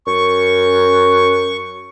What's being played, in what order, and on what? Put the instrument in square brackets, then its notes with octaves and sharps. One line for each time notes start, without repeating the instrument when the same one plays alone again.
[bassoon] F#2 [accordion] C#6